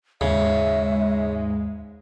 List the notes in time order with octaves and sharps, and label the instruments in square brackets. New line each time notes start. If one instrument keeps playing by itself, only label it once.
[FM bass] D#2 [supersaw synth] G#2 G#3 [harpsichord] C#3 [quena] E5